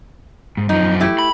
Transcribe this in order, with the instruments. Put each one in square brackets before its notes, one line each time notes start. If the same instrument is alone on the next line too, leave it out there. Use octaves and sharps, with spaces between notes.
[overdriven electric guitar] G#2
[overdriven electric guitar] F#2 F3 [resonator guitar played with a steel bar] D#4
[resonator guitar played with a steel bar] A3 E4 G4
[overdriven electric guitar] B5